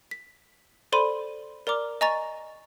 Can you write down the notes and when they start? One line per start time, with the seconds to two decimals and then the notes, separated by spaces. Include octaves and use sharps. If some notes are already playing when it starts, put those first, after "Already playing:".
0.11 B6
0.92 A4 C5 D5 B5 C6 D#7
1.67 A#4 D5 A#5 D6 F6
2.01 D#5 G#5 A#5 C#6 A6